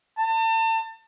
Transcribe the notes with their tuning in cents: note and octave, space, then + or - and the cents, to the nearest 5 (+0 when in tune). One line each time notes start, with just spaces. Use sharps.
A5 +35